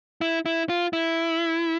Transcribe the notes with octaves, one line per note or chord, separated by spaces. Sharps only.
E4
E4
F4
E4